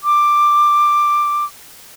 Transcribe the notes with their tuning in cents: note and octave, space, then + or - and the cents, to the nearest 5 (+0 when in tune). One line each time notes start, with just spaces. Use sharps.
D6 +10